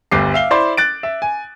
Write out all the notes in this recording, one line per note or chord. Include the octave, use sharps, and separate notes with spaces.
G1 D2 G3 D6 C7
E5 F5 G7
E4 C5 D5 B5 C6
F#6 A6 D7
E5
G#5